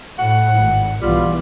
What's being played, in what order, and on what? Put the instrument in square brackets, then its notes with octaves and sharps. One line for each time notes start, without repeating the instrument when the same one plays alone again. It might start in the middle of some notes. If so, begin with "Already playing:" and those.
[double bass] A2 [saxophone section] F#5
[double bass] G#1
[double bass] B1 E3 [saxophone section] G3 F4